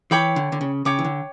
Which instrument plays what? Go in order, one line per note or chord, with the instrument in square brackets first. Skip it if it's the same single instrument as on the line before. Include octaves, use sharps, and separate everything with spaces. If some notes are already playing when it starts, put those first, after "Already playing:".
[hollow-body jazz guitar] E3 [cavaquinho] C#5 G5 B5 D6
[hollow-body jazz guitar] D3
D3
C#3
[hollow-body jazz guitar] C#3 [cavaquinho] C#5 G5 D6
[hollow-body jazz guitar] E3
D3